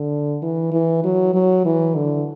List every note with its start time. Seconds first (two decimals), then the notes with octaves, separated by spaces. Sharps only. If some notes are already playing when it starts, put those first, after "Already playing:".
Already playing: D3
0.42 E3
0.72 E3
1.04 F#3
1.34 F#3
1.65 E3
1.95 D3